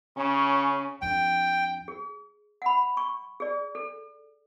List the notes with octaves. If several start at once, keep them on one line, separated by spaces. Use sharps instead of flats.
C#3 C#4
F2 D4 G5
G#4
F#5 B5
C#6
G#4 D5
A4